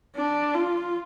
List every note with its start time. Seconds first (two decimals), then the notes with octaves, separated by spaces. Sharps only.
0.16 D4
0.54 F4